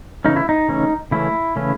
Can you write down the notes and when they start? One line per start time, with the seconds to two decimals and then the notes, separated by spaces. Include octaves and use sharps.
0.25 C#3 E3 A3 C#4 D#4
0.36 E4
0.49 D#4
0.68 C#3 E3 A3 C#4
1.11 C#3 E3 A3 C#4 E4
1.56 C#3 E3 A3 C#4